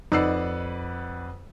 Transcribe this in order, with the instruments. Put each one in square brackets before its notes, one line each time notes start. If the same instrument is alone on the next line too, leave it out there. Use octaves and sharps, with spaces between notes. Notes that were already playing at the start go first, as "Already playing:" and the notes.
[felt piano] F2 E6 C7 [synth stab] D#4 [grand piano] B4 D5 F#5